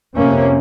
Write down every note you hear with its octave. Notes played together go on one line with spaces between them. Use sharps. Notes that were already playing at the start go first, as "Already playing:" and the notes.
F2 C3 A#3 C#4